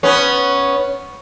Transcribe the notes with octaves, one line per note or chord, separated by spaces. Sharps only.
B3 C#4